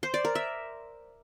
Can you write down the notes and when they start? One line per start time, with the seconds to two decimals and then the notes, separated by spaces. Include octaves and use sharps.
0.03 C5
0.14 D5
0.25 A#4
0.35 E5